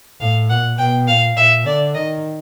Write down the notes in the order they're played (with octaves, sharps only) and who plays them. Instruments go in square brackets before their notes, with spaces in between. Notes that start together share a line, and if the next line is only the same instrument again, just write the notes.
[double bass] A2 [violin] F5
[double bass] A#2 [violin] F#5
[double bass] B2 [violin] G5
[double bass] A#2 [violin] F5
[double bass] A#2 [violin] E5
[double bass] D3 [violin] D5
[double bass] D#3 [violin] D#5